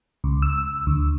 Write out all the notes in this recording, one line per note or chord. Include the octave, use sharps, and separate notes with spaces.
C#2
E6
D2